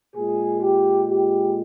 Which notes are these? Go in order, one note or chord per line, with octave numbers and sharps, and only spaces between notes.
A#2 G#3 G#4
G4
G4